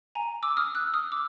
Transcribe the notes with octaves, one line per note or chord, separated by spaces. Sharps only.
G#5 A#5
D6 E6
D#6 F6
E6 F#6
D#6 F6
D6 E6